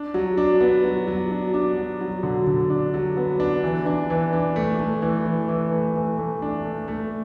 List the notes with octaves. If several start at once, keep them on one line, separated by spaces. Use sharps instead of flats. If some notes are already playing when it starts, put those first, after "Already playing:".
Already playing: D4
F#3
D4
B3
F#3
F#3
D4
D4
F#3
F#3
D3
D3
D4
F#3
B3
D4
E3
D4
E3
D4
A3
A3
E3
E3
E3
A3
E3
A3
D4
A3
A3